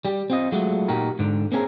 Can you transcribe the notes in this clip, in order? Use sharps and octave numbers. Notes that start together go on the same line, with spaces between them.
G3 G4
C4 F4 D#5
F#3 G#3 A3 F4 F#4
A#2 D#4 F#4 G4 A#4
G#2 D3
A#3 C4 C#4 G#4 A#4